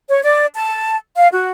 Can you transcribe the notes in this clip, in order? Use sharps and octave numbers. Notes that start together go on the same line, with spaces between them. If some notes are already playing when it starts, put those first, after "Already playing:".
C#5
D5
A5
F5
F#4